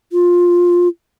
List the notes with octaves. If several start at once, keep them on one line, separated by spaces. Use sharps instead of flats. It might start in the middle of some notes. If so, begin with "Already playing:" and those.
F4